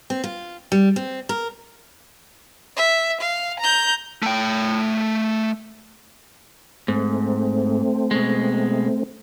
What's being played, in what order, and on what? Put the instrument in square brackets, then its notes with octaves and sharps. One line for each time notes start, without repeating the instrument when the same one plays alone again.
[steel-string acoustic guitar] C4
F4
G3
C4
A#4
[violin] E5
F5
A#5 G6
[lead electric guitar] A3 G5
[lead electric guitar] G#2 [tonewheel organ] A3 C4
[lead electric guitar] B2 G#3